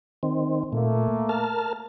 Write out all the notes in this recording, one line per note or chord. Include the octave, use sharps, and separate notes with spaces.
D#3 C4
A#2 A3 A#3
A#4 A5 F6